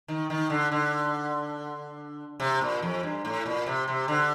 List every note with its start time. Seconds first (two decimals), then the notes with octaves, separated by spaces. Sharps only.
0.08 D#3
0.30 D#3
0.50 D3
0.72 D3
2.40 C3
2.61 A#2
2.82 F2
3.03 G2
3.25 A2
3.46 A#2
3.66 C3
3.88 C3
4.08 D3